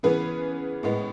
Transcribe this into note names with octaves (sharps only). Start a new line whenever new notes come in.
C#3 E3 B3 G#4 B4
A2 G#3 B3